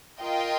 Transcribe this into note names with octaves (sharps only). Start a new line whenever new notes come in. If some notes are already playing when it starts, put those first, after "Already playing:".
F4 A#4 D#5 G5